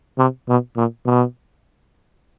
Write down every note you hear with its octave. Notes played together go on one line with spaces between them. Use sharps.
C3
B2
A#2
B2